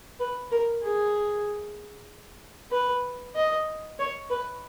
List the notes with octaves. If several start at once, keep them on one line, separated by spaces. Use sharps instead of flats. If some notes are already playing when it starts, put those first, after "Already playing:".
B4
A#4
G#4
B4
D#5
C#5
B4